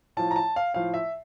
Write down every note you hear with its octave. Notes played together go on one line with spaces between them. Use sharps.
A2 F3 A5
A#5
A5
F5
A2 F3 F5
E5